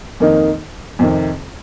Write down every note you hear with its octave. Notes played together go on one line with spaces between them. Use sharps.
F2 D#3 A#3 D#4
F2 C3 D#3